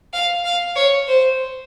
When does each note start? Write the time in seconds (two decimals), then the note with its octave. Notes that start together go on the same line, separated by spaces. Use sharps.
0.14 F5
0.45 F5
0.76 C#5
1.08 C5